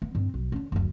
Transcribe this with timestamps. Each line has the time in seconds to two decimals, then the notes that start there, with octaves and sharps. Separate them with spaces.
0.02 B3
0.15 G2 C4
0.34 B1
0.52 D3 C#4
0.72 F#1 D2